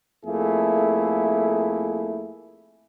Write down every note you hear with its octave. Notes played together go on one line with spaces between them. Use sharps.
F2 A3 A#3 E4 G#4